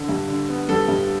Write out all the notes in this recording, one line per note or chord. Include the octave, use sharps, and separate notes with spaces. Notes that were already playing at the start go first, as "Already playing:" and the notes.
Already playing: D3
G2
D3
B3
G3 A4
G2